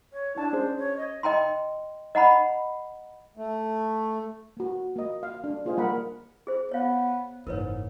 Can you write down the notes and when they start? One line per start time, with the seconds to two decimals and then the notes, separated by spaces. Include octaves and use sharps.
0.13 C#5
0.36 D4 E4 A5
0.53 C#4 G#4 C5
0.78 C#5
0.97 D#5
1.23 D#5 G5 A#5 C6
2.15 D#5 F#5 A#5 B5
3.37 A3
4.57 A#3 F#4
4.96 A#3 D#5
5.23 F5
5.44 D4
5.65 A#3 F4 G#4 C5 D#5 F5
5.77 G3 A#3 A#4 D5 F#5 B5
6.47 G#4 C5
6.72 B3 C#5 F5
7.47 F#1 G#2 E3 A#4 B4 C#5